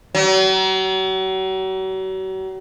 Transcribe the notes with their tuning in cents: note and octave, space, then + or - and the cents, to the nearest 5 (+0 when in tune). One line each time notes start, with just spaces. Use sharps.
F#3 +40